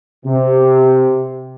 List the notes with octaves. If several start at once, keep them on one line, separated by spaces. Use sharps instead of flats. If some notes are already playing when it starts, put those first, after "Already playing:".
C3